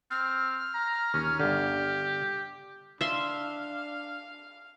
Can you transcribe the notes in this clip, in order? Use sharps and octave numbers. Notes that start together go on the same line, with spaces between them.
C4 F6
A#5
D#2 C#4
G1 D3 G4
D4 E5 F5 C6